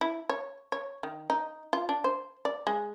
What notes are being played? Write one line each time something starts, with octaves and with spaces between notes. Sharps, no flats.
E4
C#5
C#5
D#3
D#4
F4
D4
C5
D5
G#3